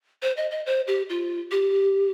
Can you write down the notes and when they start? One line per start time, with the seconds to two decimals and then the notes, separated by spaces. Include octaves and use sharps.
0.22 C5
0.37 D#5
0.51 D#5
0.66 C5
0.87 G4
1.09 F4
1.51 G4